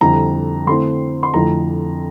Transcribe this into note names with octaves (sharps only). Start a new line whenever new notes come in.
F2 D3 G3 C4 E4 A#5
D3 A3 C4 E4 C6
C6
F2 D3 F3 A3 E4 A#5